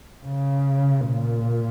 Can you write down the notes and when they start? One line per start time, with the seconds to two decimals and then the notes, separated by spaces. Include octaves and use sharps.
0.25 C#3
1.08 A#2